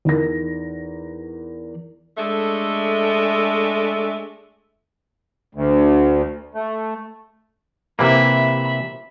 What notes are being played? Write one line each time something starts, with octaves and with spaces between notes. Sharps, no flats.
E2 D#4 A#4 A#6
G#3 A3 D4 A4 E5
D2
A3
C3 E3 A#3 E5 B5